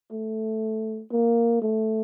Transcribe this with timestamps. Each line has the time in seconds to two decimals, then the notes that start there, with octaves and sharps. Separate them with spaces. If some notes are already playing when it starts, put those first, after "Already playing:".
0.12 A3
1.12 A#3
1.62 A3